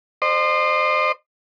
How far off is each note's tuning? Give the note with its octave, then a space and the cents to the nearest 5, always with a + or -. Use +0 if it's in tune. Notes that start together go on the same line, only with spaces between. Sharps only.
C5 +0 D#5 -40